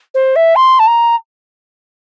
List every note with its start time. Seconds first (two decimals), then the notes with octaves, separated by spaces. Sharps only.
0.15 C5
0.36 E5
0.56 C6
0.79 A5
0.87 A#5